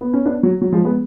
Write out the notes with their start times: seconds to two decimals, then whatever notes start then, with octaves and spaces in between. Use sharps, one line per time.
0.01 B3
0.13 C#4
0.26 B3 D4
0.43 F#3
0.61 F#3
0.72 F3 G#3
0.84 G#3 B3